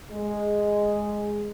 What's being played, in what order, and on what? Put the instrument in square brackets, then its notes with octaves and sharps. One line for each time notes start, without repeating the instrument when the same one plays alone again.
[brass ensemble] G#3